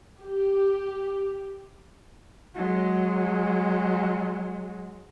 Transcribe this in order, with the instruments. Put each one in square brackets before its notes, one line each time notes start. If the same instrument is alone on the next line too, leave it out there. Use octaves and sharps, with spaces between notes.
[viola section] G4
[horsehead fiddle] F#3 G#3